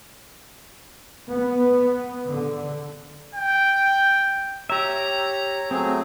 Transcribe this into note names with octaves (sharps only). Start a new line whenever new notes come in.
B3
D3
G5
G4 C#5 E5 A#5
F#3 A3 C4 G#4